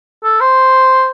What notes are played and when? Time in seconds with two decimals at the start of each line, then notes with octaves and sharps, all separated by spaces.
0.24 A4
0.41 C5